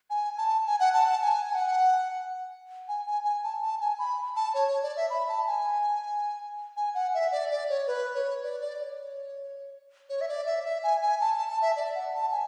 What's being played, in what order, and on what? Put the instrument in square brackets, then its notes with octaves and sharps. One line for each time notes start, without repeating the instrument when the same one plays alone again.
[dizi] G#5
A5
G#5
F#5
A5
A5
G#5
G#5
F#5
G#5
G#5
G#5
A5
A5
G#5
B5
A5
C#5
C#5
D5
E5
B5
A5
G#5
G#5
F#5
E5
D5
D5
C#5
B4
C#5
D5
D5
D5
C#5
C#5
E5
D5
E5
E5
G#5
G#5
A5
A5
A5
E5
D5
F#5
A5
G#5